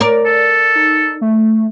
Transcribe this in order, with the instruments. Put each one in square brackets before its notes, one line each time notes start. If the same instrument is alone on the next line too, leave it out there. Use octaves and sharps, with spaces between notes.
[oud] A#4 D5
[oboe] A4
[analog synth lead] D#4
A3